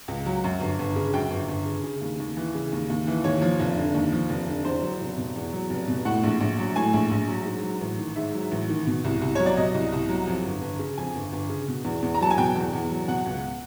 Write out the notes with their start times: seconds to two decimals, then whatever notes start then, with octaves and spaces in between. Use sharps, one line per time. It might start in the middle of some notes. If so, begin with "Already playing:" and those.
0.08 C#2
0.26 F#3
0.44 F#2
0.60 G1
0.79 G1
0.96 C#3
1.14 F#2 G5
1.31 G1
1.48 G1
1.66 C#3
1.84 C#3
2.01 D#2
2.20 D#2
2.37 E3
2.55 C#3
2.72 D#2
2.90 D#2
3.07 E3
3.24 D#2 C#5
3.42 F3
3.60 F1
3.77 D3
3.94 D#2
4.12 F3
4.29 F1
4.47 D3
4.65 E2 C5
4.82 F#3
5.01 F1
5.17 B2
5.36 E2
5.53 F#3
5.70 F1
5.88 B2
6.05 A2 F#5
6.23 A#1
6.40 A#1
6.59 F#3
6.76 A2 G#5
6.93 A#1
7.11 A#1
7.28 F#3
7.45 G#2
7.63 F#3
7.81 A1
7.98 D#3
8.16 G#2 E5
8.34 F#3
8.51 A1
8.69 D#3
8.87 B2
9.04 C2
9.22 C2
9.35 F#3 C#5
9.46 D5
9.57 B2 D#5
9.74 C2
9.92 C2
10.09 F#3
10.27 F2
10.45 G1
10.62 G1
10.79 C#3
10.97 F2 G#5
11.15 G1
11.33 G1
11.49 C#3
11.68 B2
11.84 E2
12.02 E2
12.14 A#5
12.21 F#3 A5
12.31 G#5
12.38 B2 G5
12.55 E2
12.73 E2
12.90 F#3
13.08 B2 F#5
13.26 C#2